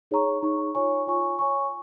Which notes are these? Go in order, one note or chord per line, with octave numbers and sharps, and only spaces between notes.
D#4 G#4 C#5 A#5 C#6
D#4 G#4 C#5 A#5 C#6
F4 C#5 G#5 C#6
F4 C#5 G#5 C#6
C#5 G#5 C#6